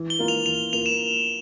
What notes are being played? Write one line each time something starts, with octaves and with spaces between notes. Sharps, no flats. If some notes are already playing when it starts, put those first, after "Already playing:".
Already playing: E3
G7
A#3 F4 A#4
F7
E3 F7
A#3 F4 A#4 F7
E7